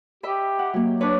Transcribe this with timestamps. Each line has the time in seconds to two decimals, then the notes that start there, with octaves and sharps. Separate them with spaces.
0.23 G4 D#5 E5 B5
0.59 F#5
0.74 F#3 A#3
1.01 D4 B4 C#5